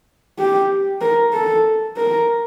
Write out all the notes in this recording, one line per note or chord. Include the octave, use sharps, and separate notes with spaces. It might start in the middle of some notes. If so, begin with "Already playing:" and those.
G4
A#4
A4
A#4